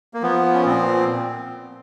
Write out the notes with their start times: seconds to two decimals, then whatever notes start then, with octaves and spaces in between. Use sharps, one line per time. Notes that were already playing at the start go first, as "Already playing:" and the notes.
0.14 A#3
0.22 F3 B3
0.54 C#4
0.65 A#2 C4